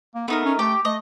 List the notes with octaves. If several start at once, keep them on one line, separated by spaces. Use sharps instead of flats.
A#3
A3 B3 D#4 A#4
C#4
A3 G4 G5
A3 D#5